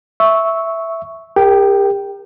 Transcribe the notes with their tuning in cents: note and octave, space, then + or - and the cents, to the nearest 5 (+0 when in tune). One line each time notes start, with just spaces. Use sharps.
E5 +0 C#6 +0 E6 -15
G4 +40 A#4 +0 G5 -10